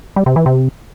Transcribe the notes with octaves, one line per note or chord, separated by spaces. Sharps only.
G3
C3
E3
C3